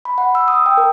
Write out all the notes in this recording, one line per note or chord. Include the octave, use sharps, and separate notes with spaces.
B5
F#5
E6
D#6
G5
A#4